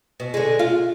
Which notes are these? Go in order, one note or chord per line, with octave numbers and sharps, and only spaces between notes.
B2
D3 G#3
F4